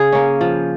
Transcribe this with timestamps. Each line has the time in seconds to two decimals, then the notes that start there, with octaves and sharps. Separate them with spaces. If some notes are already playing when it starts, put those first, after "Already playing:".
Already playing: C#3 G#4
0.13 A#3 C#4
0.41 F3